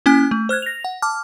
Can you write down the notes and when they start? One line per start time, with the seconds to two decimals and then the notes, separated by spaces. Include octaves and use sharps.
0.06 A#3 C#4 E4 G#5 F#6
0.31 A3
0.49 C5 F6 F#6 G#6
0.62 A#6 F7
0.85 F#5
1.02 A5 D6 F6